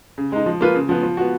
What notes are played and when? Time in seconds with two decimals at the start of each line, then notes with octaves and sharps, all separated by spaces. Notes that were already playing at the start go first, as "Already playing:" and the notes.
0.18 C#3
0.32 G#3 D#4
0.46 F3
0.61 A#3 F4 B4
0.75 C#3
0.89 F3 B3
1.03 F3
1.17 B3 F#4